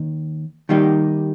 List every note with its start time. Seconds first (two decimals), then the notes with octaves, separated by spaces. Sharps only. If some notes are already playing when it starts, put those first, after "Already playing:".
Already playing: D#2 D#3 D#4
0.69 D#3 G3 A#3 D#4 G4